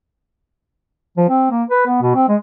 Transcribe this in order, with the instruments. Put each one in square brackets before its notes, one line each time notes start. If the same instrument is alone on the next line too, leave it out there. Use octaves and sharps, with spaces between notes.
[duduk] F3
C4
A#3
B4
B3
B2
C4
G#3